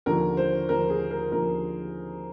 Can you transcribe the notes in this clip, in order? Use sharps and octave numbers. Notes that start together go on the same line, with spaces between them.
D#2 D3 F3 A#4
C5
D#2 D3 F3 A#4
G#4
A#4
D#2 D3 F3 A#4